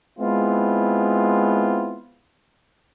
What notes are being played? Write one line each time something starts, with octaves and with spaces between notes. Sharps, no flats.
G#3 B3 C4 E4 F4